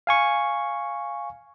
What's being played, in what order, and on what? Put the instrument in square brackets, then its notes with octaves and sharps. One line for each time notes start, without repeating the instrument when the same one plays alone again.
[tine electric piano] F5 G#5 C#6